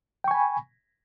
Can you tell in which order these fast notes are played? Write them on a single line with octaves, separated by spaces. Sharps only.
G5 C#6 G#5 B5